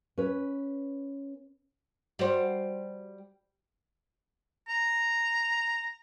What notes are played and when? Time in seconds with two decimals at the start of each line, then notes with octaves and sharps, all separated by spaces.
0.18 C#4 B4
2.19 G3 F#4 C5
4.68 A#5